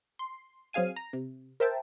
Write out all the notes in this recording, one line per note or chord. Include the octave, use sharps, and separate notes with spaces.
C6
F#3 C4 G#4 F5 G#5 D#7
A#5
C3
A#4 C5 E5 G5 A5